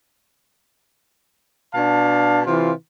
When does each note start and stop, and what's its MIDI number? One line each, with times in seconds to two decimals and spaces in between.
1.74 2.41 47
1.74 2.41 62
1.74 2.41 77
1.74 2.41 81
2.46 2.72 48
2.46 2.72 52
2.46 2.72 65